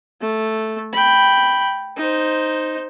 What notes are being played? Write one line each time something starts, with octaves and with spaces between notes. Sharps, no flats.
A3
G5 B5
D#4 C5